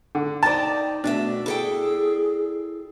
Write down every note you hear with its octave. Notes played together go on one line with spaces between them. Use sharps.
D3
D#4 C5 D5 G5 A5
B2 A3 D4 E5
E4 G#4 A4 G5